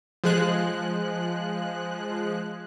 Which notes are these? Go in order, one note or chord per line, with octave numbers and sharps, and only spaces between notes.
F3 G#3 F#6